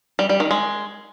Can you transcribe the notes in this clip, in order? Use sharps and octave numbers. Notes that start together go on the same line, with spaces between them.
G3
G3
D#3
G#3